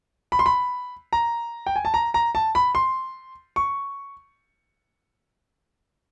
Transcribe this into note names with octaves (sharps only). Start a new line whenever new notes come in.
B5
C6
B5
A#5
G5
G#5
A5
A#5
A#5
A5
B5
C6
C#6